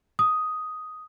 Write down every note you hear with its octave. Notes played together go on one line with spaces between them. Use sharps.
D#6